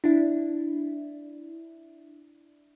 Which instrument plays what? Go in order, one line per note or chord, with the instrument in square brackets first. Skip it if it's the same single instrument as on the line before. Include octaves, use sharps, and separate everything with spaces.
[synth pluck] D4 E4